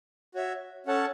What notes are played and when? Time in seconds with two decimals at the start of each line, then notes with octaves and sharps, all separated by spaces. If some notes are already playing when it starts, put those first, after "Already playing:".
0.35 F#4 C#5 E5
0.86 C#4 A4 C#5 F#5 A5